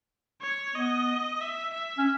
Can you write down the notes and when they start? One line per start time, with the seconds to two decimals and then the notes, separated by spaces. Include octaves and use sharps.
0.41 C#5
0.75 B3 D#5
1.41 E5
1.73 E5
1.98 C#4